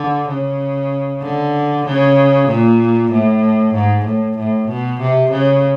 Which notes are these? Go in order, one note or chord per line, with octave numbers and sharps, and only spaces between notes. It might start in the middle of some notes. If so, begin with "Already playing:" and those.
Already playing: D3
C#3
D3
C#3
A#2
A2
G#2
A2
A2
B2
C3
C#3